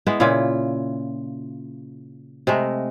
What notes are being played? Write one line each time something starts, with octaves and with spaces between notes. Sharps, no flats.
G#3 B3 E4
A#2 C#3 E4 F4
C3 G#3 A3